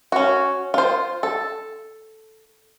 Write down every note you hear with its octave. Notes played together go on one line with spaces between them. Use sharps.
C#4 F#4
F4 C5
A4